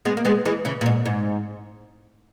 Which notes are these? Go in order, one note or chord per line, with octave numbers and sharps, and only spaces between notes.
G#3 B3
A#3
G#3 B3
E3 G#3
C#3 E3
A#2
G#2
G#2